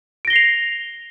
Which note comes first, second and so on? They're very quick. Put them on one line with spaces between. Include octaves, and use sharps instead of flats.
D7 A#6 G7 C7 F7